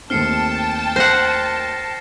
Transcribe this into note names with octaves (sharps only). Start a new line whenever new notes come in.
D#2 A3 C4 G5 A5 F6 C7 C#7
C5 F#5 A#6 C7